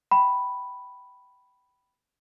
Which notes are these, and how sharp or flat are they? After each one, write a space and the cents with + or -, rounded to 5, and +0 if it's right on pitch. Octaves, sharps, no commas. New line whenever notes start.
G5 -20 B5 +0